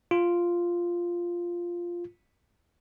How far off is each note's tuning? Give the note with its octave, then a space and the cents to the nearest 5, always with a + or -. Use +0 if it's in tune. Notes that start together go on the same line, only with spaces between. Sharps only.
F4 -5